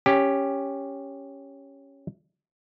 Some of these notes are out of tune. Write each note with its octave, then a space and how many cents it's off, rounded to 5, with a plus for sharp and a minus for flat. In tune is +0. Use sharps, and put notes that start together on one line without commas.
C#4 +0 G4 +10